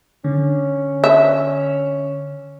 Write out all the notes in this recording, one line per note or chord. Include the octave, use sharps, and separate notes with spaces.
D3 C#4
E5